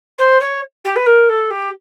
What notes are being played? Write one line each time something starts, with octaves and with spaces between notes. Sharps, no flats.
C5
C#5
G4
B4
A#4
A4
G4